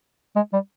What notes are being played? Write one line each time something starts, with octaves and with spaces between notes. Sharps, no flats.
G#3
G3